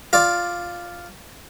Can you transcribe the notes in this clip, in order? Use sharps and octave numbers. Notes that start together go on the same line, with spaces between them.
F4 D5